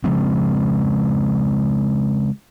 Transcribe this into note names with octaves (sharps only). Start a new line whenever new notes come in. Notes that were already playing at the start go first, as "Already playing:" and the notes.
C#3 F3 G#3 C4